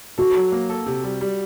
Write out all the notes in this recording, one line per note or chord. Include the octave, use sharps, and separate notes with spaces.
F#4 A4
F#3
A#3
A4
C3
G3
G3